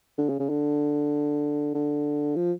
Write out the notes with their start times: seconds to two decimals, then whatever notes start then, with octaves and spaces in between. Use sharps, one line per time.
0.18 D3
0.29 C#3
0.39 C#3
0.49 D3
1.74 D3
2.36 F3